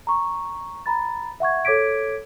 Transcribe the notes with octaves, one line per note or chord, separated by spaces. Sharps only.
A#5 C#6
A#5 B5 A6
E5 F#5 C#6 G#6
A4 C#5 D6 G#6 B6 D7